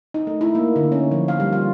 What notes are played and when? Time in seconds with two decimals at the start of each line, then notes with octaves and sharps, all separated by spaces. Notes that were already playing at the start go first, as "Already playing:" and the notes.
0.14 D#4
0.27 A3
0.41 E4
0.55 A#3
0.76 D3
0.92 C#4
1.11 F3
1.28 F5
1.40 G3
1.53 F4